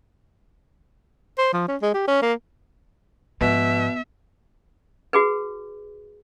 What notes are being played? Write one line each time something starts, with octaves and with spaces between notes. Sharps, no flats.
C5
F3
C#4
G#3
G4
C#4
A#3
G#2 B2 F3 B3 E5
F#4 G#4 B4